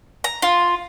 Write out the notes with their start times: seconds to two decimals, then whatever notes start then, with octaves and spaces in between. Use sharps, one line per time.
0.24 A#5
0.42 F4